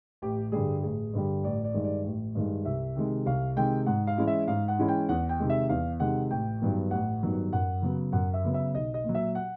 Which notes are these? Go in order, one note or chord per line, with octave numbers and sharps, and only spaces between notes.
A1 G4
G2 D3 G3 G#4
A1 G#4
G2 D3 G3
A1 D5
D5
G2 D#3 G#3
D5
A1
G2 D#3 G#3
C2 E5
C3 D#3 G#3
C2 F5
C3 D#3 G#3 G5
G#2 F#5
F5
E3 G#3 C#4 E4
E5
G#2 F5
F#5
E3 G#3 C#4 E4
G5
E2 F#5
G5
C3 D#3 G#3
E5
E2 F5
C3 D#3 G#3 F#5
A1 G5
G2 D#3 F#3 B3
A1 F#5
G2 D#3 F#3 B3
F#2 F#5
C#3 F#3 B3
F#2 F#5
E5
C#3 F#3 B3
E5
B1 D#5
D#5
A#2 F#3
E5
F#5